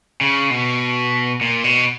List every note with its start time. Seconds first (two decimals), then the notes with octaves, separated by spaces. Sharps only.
0.21 C#3
0.51 B2
1.41 A#2
1.64 B2